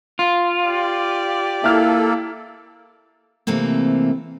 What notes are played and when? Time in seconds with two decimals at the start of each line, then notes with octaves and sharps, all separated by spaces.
0.19 F4
0.64 G4 D5
1.64 A#3 E4 A4 F6
3.47 C3 E3 A3 A#3 C4